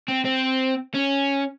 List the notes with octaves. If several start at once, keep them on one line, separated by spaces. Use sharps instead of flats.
C4
C4
C#4